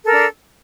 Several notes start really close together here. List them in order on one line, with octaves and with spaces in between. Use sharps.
A4 A#4 D4